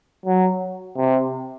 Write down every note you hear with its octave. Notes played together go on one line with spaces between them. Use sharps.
F#3
C3